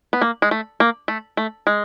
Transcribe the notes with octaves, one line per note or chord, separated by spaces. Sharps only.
B3
A#3
G#3
A3
A#3
A3
A3
G#3